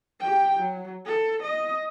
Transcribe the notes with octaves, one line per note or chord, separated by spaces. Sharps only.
G4 G5
F#3
A4
D#5